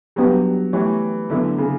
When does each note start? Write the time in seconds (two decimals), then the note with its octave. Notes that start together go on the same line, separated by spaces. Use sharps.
0.16 F#3 G3 B3 D4 G4
0.73 E3 A3 E4 G4 C#5
1.30 D3 F#3 B3 E4 A4
1.58 C#3